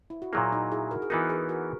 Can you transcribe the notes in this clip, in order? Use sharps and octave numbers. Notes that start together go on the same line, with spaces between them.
E4
F#4
A#2 F#3 A#3 E4 G#4
D#4 F#4
E4 G#4
F#4 A#4
G#4
E3 B3 D#4 F#4 A#4
G#4 B4
F#4 A#4